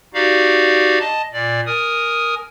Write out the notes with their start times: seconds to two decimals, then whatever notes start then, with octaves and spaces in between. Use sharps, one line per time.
0.14 D#4 F#4 G4 D5 F5
1.00 D#5 A5
1.33 A#2 D5
1.66 A#4 G#5 D#6